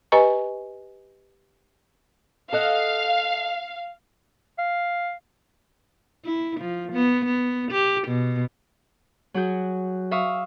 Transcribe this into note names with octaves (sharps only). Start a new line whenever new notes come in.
G4 B4 D#5 G#5 A#5 C#6
A4 D#5 F5 F#5
F5
E4
F3
B3
B3
G4
B2
F#3 F#4 G#4 G6
E5 F5 C#6 D#6